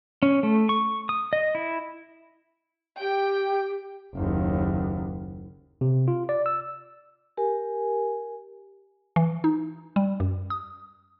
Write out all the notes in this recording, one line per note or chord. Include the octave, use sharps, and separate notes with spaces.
C#4
A3
C#6
D#6
D#5
E4
G4 G5
F#1 D#2
C3
F4
D5
E6
G4 A#4 G#5
E3
D#4
G3
F#2
D#6